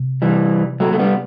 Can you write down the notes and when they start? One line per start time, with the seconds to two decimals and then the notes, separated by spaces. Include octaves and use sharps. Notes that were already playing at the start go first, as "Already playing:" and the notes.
Already playing: C3
0.22 E3 G3
0.80 F#3 A3
0.93 A3
0.99 G3 B3